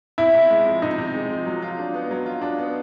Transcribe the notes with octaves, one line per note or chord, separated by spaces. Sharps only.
C3 E4
C3
G#3
F3
C3 D#4
C3
G#3
F3
F#3
F4
D4
B3
F#3
F4
D4
B3